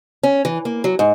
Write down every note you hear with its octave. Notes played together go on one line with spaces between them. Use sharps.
C#4
E3
A#3
F#3
G#2